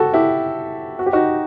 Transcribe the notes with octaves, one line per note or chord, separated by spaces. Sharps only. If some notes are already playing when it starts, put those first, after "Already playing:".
Already playing: F#4 G4 A4
E4 G4
F#4
G4
D#4 F#4